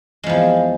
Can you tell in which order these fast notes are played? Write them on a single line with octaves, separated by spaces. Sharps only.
G#3 F3 E2